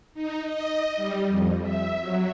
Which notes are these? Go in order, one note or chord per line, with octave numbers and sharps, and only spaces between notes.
D#4
D#5
G3
F2
E5
F#3